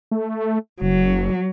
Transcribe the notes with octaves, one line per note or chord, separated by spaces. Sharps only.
A3
F#1 F#3